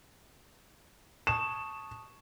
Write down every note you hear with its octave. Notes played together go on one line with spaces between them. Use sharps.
A5 C#6 D#6 E7